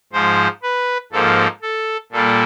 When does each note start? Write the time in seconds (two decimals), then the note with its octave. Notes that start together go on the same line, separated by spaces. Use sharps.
0.13 G#2 F3 G#3 C5
0.63 B4
1.12 G#2 F3 A#3 A4
1.62 A4
2.12 A#2 G3 A#3 A4